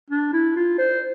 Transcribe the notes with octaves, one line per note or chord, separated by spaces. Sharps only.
D4
E4
F4
C5